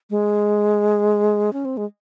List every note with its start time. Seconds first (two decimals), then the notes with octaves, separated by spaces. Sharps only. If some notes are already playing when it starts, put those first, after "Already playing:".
0.10 G#3
1.53 C#4
1.65 C4
1.77 G#3